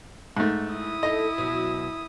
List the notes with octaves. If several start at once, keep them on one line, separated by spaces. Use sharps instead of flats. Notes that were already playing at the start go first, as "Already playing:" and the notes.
G#2 A3
E4 D#6
A3 D#4 D#5
B2 F#3